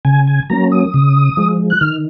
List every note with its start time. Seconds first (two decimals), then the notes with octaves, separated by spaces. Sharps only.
0.05 C#3 G#5
0.27 G#5
0.50 F#3 A#3 C#4 A#5
0.72 D#6
0.94 C#3
1.37 F3 G#3
1.70 F#6
1.81 D#3 F6